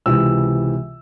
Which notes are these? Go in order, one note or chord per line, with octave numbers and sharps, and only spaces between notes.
C#2 C3 E3 E6